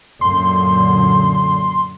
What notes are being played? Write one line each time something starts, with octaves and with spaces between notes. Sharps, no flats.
F#2 A#2 D3 C6